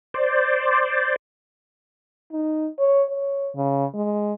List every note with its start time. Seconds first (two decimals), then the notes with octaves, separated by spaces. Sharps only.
0.14 C5 D5
2.32 D#4
2.79 C#5
3.09 C#5
3.55 C#3
3.95 G#3